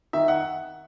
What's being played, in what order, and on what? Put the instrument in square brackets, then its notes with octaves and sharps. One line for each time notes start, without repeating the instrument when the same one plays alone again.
[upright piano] D#3 E5
F#5